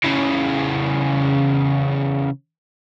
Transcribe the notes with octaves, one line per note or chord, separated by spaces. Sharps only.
C#3 E3